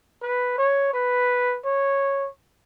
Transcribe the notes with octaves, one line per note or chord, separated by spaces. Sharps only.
B4
C#5
B4
C#5